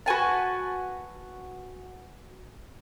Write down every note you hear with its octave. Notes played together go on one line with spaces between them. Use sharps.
F#4 B4 G#5 A5